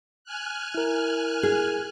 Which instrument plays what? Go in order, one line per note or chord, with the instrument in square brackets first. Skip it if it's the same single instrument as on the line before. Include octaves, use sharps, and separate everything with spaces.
[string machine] G#5 F6 F#6
[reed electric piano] E4 A#4
[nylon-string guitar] G#4